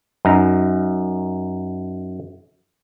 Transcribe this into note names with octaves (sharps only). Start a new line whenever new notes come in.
F#2 D#4 A#5